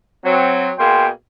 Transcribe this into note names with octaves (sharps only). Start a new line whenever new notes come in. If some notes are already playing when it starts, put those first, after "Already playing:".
F#3 C4
B2 A#3 G#4 G5 C6